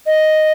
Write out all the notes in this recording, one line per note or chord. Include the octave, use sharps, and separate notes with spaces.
D#5